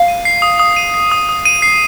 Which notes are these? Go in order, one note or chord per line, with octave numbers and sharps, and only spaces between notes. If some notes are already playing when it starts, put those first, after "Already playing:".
Already playing: F5
D#7
C7
D#6
D#6
D#7
C7
D#6
D#6
D#7
C7